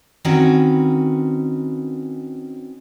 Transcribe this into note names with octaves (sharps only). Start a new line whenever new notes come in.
D#3 C4 C#4 F#4 B4